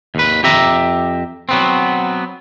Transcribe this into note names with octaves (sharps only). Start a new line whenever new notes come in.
D#2 B4
F2 G4 E5 A#5
F#3 B3 C4